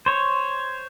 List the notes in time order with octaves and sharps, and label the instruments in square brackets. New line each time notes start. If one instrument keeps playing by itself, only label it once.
[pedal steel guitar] C5 C#5